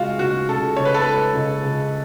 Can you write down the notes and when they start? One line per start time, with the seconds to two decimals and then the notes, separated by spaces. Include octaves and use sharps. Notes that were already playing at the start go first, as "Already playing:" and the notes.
Already playing: C#2 G#3 F4 F#4
0.19 C#2 F#4
0.48 C#3 A4
0.77 C#2 C#5
0.85 B4
0.94 A4
1.02 G#3 B4
1.34 C#2
1.63 C#3